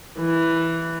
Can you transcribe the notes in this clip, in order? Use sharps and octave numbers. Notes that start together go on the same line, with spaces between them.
E3